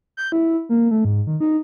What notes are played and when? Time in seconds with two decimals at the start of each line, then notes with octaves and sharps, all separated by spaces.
0.17 G6
0.32 E4
0.69 A#3
0.91 A3
1.05 G#2
1.27 D#3
1.40 D#4